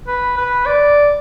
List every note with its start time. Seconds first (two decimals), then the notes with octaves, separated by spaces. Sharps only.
0.07 B4
0.37 B4
0.66 D5